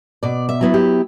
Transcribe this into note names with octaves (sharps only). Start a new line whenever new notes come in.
B2 D5
E5
F#3 B3 E4
G4